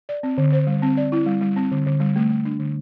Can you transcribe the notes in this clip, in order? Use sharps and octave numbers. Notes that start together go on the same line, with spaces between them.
D5
C4
D3
C5
G3
C4
D5
E4
G3
G3
C4
D3
D3
G3
A3
A3
D4
D3